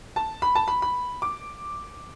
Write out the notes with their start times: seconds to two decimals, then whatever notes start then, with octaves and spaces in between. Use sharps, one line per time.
0.16 A5
0.42 B5
0.55 A5
0.68 B5
0.82 B5
1.22 D6